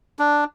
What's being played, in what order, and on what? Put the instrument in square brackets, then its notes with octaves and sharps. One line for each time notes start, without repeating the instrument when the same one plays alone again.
[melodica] D4